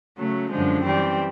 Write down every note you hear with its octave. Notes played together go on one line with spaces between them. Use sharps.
C#3 F#3 A3
F#2 D3 F3 G#3
E3 G3 C4